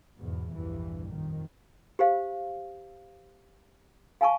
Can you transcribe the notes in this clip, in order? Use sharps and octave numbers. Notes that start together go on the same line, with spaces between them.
E2 G#2 B2
A#1 E2 G2 E3
F2 D#3
G4 C5 F5
F5 G#5 A5 C#6